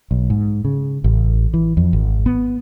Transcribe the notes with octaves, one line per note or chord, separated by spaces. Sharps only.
B1
G#2
C#3
A1
E3
F2
G#1
B3